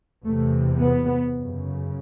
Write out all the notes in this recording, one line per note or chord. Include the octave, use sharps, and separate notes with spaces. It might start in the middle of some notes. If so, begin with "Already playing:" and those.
E2 C3 A3
B3
F#2 C#3